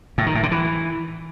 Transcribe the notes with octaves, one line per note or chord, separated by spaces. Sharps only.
A2
D#3
A2
D3
E3